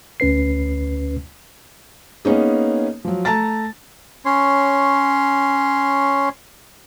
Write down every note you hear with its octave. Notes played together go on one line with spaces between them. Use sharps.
D2 C#4 B4 C7
A#3 B3 C#4 D#4 G#4
F3 F#3
A3 A5 A#5 A6
C#4 C#5 C6